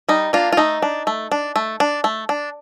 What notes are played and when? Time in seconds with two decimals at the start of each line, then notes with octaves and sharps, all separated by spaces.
0.09 G3 D#4
0.33 A#3 D4 F4
0.53 F4
0.57 A3 D#4
0.82 D4
1.07 A3
1.32 D4
1.56 A3
1.80 D4
2.04 A3
2.29 D4